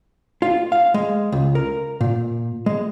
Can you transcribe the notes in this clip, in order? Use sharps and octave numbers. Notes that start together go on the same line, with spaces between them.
F4
F5
G#3
C#2
A#4
A#2
G#3